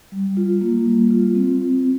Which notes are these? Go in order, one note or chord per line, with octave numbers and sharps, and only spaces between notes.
G3
F4
A#3
G3
F4
C4